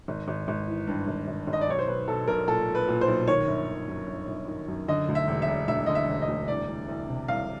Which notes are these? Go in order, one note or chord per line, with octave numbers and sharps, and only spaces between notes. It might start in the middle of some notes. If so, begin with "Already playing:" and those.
G#1
G#1
G#1
E3
G2
G#1
G#1
G#1
D#5
D5
B1 C#5
C5
B1 B4
B1 A4
B1 A#4
A#2 A4
A#2
B4
A#2
C5
B1
D#3 C#5
G1
D#3
F#2
G1
G1
D#3
F#2
D3 D#5
D2
E5
E1
E5
E1
D2 E5
D3 D#5
E5
E1
D#5
D2
C2 D5
C2
C2
C3
C2 F5